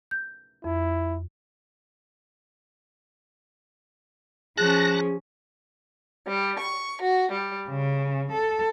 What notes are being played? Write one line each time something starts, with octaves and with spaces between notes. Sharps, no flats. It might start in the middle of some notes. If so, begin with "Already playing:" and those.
G6
F2 E4
F3 C#4 G#4 A5 F#6 A#6
G3
C#6
F#4
G3
C#3
A4